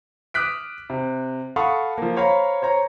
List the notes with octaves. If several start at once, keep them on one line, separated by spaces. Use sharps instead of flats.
D6 D#6 F6 F#6 B6 D7
C3
A4 F5 F#5 B5 C#6 D#6
F3 A#3
C5 C#5 F5 A#5 B5
C5 C#5 A#5